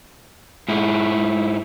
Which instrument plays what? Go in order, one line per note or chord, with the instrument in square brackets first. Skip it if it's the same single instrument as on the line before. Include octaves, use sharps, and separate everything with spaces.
[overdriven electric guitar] G#2 E4